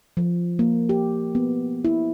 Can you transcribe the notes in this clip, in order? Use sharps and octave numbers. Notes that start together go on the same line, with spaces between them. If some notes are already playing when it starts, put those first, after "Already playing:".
F3
A#3
G4
B3
E4